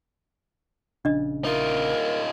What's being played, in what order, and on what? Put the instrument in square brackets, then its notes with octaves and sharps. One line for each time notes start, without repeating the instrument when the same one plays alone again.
[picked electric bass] A#1 C#3 [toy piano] D4 D#5
[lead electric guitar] D#4 F4 [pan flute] A#4